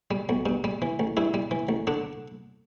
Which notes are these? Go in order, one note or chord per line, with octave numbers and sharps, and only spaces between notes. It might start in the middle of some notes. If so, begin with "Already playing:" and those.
G3
B1
G2
G3
E3
A1
G2 E4
G3
E3
A1
D3 D4